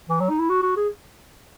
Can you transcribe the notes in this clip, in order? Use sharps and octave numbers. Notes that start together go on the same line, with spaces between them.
E3
F#3
D#4
E4
F#4
F#4
G#4